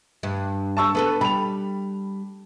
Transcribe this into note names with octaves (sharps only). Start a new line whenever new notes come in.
G2
A5 C#6 E6
B3 A4 B4
G3 B5 F7